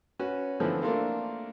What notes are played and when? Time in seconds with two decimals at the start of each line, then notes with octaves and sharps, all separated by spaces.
0.19 C#4 F#4 B4
0.60 D3 E3 F3 A3 B3 C4
0.82 A3 A#3 C4 D4 F4 A#4